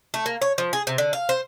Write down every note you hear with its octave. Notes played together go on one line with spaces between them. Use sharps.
A3
A#3
C#5
F3
G#4
C3
D3
F5
C5